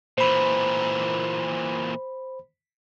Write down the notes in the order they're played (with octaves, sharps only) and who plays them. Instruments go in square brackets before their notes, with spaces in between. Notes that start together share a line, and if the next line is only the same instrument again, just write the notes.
[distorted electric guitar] A#2 E3 [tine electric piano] C5 B5